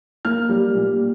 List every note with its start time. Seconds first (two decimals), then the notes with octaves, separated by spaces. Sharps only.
0.25 A#3 F6
0.49 G3
0.75 A#2